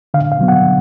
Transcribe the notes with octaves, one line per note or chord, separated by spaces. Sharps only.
D3 F5
F5
F#3 B3
F#5
D3